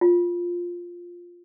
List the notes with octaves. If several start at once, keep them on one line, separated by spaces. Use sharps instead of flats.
F4